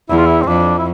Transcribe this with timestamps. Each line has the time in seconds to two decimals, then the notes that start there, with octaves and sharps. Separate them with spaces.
0.09 E2 E4
0.18 F4
0.26 E4
0.42 C4
0.47 F2 D4
0.78 E4